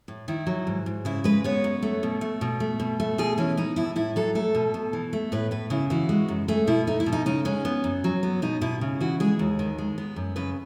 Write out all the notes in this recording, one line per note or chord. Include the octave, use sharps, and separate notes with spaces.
A2
D#3 E4
F#3
G#2
G#2
C#3 E4
G#3 B4
B3 C#5
F#2
A3
B2
A3
B2
A3
B2
A3
B2 G#4
E3 C#4
B3 D#4
A2 E4
A2 E4
F#3 A4
A3 A4
B2
B2
E3
A3
A2 B4
A2 B4
C#3 E4
E3 F#4
G#3
F#2
A3 G#4
B2 E4
A3 D#4
E4
B2
D#4
C#3 D#4
G#3 C#4
B3
F#2
F#3
B3
B2 D#4
B2 E4
C#3
E3 F#4
G#3 G#4
D#2
D#3
G#3
B3
F#2
C#3 B4